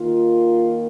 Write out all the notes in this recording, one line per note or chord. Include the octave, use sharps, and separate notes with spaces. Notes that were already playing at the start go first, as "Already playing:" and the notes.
Already playing: D#3 A#3 F4